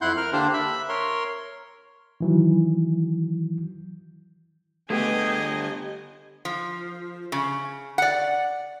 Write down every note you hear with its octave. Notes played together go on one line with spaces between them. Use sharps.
F2 E4 F#5 C6 G6
A#4 F6
D3 A#3 D4 G4 C5
E5 B5
A#4 C#5 C6
D#3 E3 F#3
D3 A3 B3 G4 G#4 D#5 G5 G#5
F3
C#3
D5 F#5